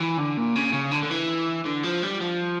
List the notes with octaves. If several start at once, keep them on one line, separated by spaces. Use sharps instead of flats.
E3
D3
A#2
C#3
C#3
D3
D3
E3
D3
F3
G3
F3